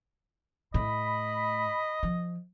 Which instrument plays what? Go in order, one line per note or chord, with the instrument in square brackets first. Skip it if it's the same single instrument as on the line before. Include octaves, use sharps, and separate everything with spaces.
[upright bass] A2 [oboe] D#5 [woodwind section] B5
[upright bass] F3